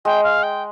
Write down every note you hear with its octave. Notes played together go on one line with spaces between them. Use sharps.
G#3 G5
F5
G5